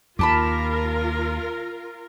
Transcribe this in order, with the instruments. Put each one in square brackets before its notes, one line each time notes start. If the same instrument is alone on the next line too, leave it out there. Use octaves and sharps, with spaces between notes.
[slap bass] D#2 [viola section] F4 A#4 [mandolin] G4 A5 B5